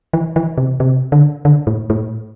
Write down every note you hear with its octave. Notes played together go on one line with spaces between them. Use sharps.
E3
E3
C3
C3
D3
D3
A2
A2